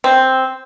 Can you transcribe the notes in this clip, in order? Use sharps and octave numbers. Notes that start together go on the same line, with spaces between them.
C4